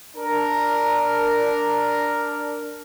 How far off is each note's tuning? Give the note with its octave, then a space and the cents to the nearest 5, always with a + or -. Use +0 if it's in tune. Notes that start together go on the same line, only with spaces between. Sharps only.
D4 +0 A#4 +0